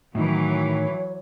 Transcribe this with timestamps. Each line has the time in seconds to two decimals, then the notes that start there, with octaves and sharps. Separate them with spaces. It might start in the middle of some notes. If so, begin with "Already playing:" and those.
0.15 A2 D#3 E3 F#3
0.50 C#5